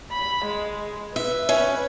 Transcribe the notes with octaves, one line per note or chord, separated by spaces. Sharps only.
B5
G#3
B4 E5
C#4